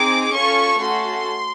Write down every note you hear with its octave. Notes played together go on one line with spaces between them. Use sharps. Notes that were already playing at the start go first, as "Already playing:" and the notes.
Already playing: C4 D#4 G#4 D6
C#4 F4 A4 C#6
A3 C#4 F#4 A4 C6